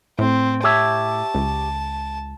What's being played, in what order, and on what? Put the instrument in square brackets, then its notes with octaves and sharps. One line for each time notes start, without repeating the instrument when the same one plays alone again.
[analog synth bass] A2 [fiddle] C4
[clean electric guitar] G4 C#5 E5 [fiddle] A5
[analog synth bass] C#2